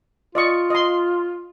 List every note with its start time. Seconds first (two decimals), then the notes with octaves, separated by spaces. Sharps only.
0.35 F4 D5 D#5 C#6
0.70 D#5 C6